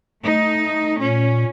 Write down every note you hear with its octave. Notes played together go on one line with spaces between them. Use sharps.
A3 D#4
A#2 C#4